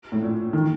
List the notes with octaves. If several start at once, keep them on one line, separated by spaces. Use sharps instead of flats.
A2
A#2
D#3